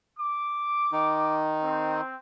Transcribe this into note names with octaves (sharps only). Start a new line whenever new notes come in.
D6
D#3 D#4
C4